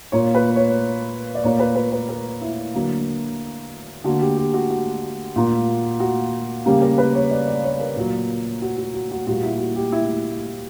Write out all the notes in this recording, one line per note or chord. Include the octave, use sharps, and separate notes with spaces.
A#2 A#3 C#5
B4
C#5
D5
A#2 A#3 C#5
B4
B4
B4
A#4
E4
D3 F#3 A#3
D3 A#3 F#4
G4
G4
F#4
F#4
A#2 A#3
F#4
C#3 G3 A#3 G4
A#4
B4
C#5
D5
D5
C#5
A#4
A#2 F#3 A#3
F#4
F#4
F#4
F#4
A#2 G3 A#3 F#4
E4
F#4
G4
E4